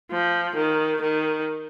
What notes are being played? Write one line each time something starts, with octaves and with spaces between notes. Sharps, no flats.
F3
D#3
D#3